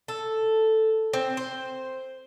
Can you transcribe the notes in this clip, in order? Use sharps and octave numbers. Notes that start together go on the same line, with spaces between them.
A4
C4
C5